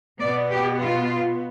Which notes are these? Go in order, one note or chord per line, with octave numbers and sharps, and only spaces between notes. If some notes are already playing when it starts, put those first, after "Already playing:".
B2 B3 D5
G4
F4